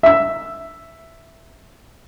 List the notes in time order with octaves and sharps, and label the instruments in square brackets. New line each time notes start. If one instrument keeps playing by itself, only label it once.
[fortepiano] E5 E6